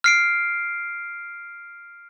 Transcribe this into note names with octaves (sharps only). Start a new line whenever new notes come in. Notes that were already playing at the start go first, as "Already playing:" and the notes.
F6 C7 D7